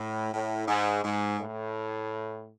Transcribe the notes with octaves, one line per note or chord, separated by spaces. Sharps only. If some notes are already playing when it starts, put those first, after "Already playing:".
Already playing: A2
A2
G#2
G#2
A2